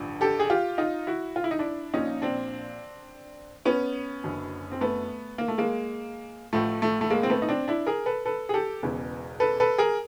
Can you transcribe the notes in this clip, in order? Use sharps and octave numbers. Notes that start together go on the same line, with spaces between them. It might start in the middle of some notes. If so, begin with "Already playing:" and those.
Already playing: A1 G2 D3 F3
G4 A4
G#4
F4 G4
D#4 F4
E4 F#4
F4
E4
D#4
D4 E4
A#1 A#2 F3 C#4 D#4
C4 D4
B3 C#4
F#1 F#2 D3
C4
A3 B3
A#3
A3
G#3 A#3
A1 A2 F3 A3
A3
A3
G#3 A#3
C4
A3 B3
D#4
C4 D4
D4 E4
G#4 A#4
A4 B4
A4 B4
G#4
G4 A4
E1 E2 C#3 E3
A4 B4
A4 B4
G#4 A#4